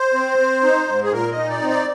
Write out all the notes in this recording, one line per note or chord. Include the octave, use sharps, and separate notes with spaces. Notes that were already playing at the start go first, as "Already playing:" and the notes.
Already playing: C5
C4
C4
D#4
G#2
G#4
A#2 A#4
D#5
D#4
D5
C4
D5